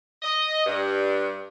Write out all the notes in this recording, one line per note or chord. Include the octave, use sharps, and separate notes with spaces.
D#5
G2